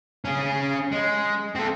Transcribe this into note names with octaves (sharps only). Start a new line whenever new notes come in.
C#4 G#4
G#3
C4 A4